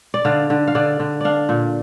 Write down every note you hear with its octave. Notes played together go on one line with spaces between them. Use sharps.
D5
D3 F5
D3
F5
D3 D5
D3
D4 D5 F5
A#2